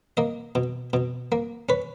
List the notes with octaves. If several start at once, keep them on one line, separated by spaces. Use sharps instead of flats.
A#3 D#5
B2
B2
A#3
C#4 B4